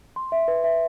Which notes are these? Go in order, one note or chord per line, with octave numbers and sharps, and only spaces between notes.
C6
E5
B4
E5